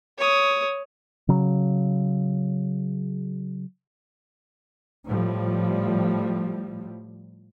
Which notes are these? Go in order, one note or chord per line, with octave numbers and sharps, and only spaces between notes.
C#5 D#6
C#3 F#3
A2 F3 G3